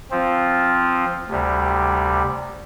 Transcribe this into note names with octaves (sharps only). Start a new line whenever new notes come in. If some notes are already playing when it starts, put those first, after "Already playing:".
F3 C4 F4
D2 C3 G3